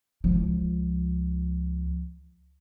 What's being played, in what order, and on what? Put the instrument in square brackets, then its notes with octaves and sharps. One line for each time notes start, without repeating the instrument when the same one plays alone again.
[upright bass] C#2 F3